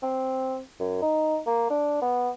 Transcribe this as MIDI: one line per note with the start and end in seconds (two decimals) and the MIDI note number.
0.03 0.59 60
0.80 1.01 42
1.02 1.39 63
1.46 1.66 58
1.70 2.01 62
2.02 2.30 59